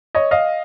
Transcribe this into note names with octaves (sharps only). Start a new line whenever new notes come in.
C#5 D#5
D#5 F5